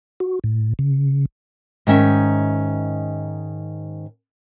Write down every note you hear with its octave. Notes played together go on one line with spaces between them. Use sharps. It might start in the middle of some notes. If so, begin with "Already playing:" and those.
F#4
A2
C#3
G#2 D#3 C#4 E5